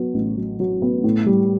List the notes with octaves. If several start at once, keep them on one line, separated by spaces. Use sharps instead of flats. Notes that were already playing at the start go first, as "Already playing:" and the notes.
Already playing: F#3 B3
A1
F#3
F#3
B3
A2
G3